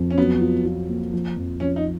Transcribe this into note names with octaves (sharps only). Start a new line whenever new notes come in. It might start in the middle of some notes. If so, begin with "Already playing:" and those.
Already playing: F2
C#4
F#3 B3
F4
F4
A#3
F3
F2
F3 C#4
D#4